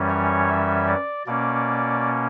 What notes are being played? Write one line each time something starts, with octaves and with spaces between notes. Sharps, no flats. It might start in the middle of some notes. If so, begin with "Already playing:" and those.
Already playing: F#2 E3 G3 C#4
C#5
E5
D5
B2 A#3 C#4 D5